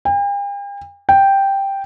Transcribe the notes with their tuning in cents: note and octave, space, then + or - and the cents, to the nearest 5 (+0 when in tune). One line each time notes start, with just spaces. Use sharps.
G5 +45
G5 +0